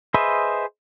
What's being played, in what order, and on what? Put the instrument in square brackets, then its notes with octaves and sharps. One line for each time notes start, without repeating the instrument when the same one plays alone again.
[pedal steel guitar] G#4 B4 C5 D#5 E5